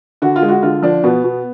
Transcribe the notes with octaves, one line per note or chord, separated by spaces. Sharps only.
D3 F#4
F4
G#3
F#4
D3 F4
F3 D4
B2 B3
B2